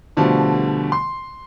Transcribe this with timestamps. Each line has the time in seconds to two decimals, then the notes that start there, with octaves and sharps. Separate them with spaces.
0.17 B2 D3 F3 G3 A3
0.92 C6